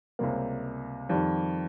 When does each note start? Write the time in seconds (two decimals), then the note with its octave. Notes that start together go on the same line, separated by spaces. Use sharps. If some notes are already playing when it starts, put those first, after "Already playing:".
0.19 C#2 C3 G3 A#3
1.09 F2 D#3 G3